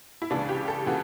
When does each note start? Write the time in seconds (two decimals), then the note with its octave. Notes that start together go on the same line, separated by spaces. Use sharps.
0.22 E4
0.30 C#2 C#3 E3 D4
0.49 G4
0.68 A4
0.86 C#3 E3 F#4